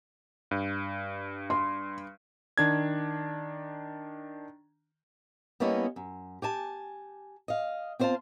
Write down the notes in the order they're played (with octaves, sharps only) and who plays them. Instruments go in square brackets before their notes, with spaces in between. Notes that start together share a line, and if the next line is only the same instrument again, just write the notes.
[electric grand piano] G2
[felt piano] C6
[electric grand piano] D#3 D4 G#6
[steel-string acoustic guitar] G3 A#3 B3 C#4 E4 D#5
F#2
G4 G#5 A5
D#5 F5
C4 F4 C5 E5 F5 A5